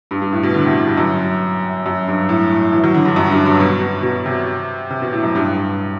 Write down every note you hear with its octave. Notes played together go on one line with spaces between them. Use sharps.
G2
G2
A2
B2
D3
C3
A2
G2
F#2
F#2
G2
A2
E3
F#3
D3
G2
F#2
G2
G2
B2
B2
B2
C3
C3
B2
A2
F#2
G2
G2